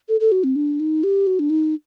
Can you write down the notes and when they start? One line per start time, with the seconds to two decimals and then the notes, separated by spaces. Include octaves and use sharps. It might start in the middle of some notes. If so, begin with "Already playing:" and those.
0.09 A4
0.20 A4
0.32 F#4
0.44 C4
0.56 D4
0.80 D#4
1.03 G4
1.27 F#4
1.39 D4
1.50 D#4